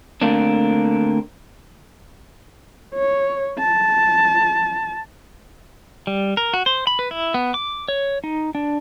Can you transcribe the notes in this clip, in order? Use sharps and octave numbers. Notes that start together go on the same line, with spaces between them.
D3 A3 A#3 C4 D4
C#5
A5
G3
A#4
F#4
C5
B5
B4
E4
B3
D6
C#5
D#4
D4